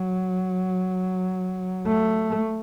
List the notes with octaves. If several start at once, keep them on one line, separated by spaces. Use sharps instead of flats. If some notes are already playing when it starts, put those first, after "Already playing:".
Already playing: F#3
A3